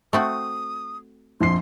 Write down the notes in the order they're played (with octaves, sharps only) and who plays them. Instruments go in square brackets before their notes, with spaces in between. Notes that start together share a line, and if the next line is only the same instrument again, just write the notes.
[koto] A3 C4 F#4 [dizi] D#6
[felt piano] A#1 F2 C7 [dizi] C6